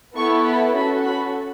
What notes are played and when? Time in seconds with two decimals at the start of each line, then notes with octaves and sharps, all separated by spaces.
0.16 B3 E4 A4 C#6
0.46 B5
0.75 C#4 F#4 A4 B5
1.05 B5